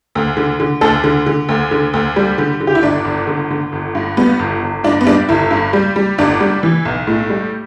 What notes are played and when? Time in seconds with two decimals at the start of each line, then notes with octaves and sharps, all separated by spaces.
0.15 D2
0.37 D3
0.60 D3
0.81 D2 A4
1.04 D3
1.26 D3
1.49 D2
1.71 D3
1.94 D2
2.16 G3
2.38 D3
2.60 D3
2.67 G4
2.75 E4
2.83 G1 D4
3.05 G1
3.27 D3
3.51 D3
3.72 G1
3.95 G2
4.17 G3 B3
4.39 G1
4.62 G1
4.84 G2 D4
5.01 B3
5.06 G3 D4
5.29 G1 E4
5.51 G2
5.73 G3
5.96 G3
6.18 G1 D4
6.40 G3
6.63 E3
6.85 B1
7.07 A2
7.29 G3